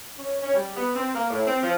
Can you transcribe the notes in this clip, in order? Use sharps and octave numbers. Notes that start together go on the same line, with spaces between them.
C#4
C#4
G3
B3
C4
A#3
A2
C4
F3